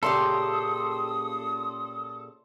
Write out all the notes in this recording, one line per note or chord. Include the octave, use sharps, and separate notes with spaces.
A#2 C#3 G4 A4 C6 D6 D#6